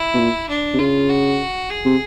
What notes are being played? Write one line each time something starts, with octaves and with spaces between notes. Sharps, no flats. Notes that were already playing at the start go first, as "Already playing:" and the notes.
Already playing: E4
B2
A#2
D4
C3
C#3 F4
F#4
G#4
C3